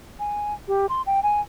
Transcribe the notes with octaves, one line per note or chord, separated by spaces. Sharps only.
G#5
G4
C6
G5
G#5